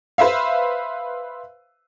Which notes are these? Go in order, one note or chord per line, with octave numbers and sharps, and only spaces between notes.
B4 C5 E5 F5